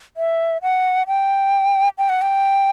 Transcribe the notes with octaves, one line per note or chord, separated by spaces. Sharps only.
E5
F#5
G5
G5
F#5
G5